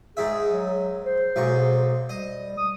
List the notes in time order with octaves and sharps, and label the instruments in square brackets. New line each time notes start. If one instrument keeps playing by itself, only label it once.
[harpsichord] G#2 D#3 E5 [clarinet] G#4
[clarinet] F#3
C5
[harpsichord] B1 G#2 C#6
[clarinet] G3 [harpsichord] D#5
[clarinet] D#6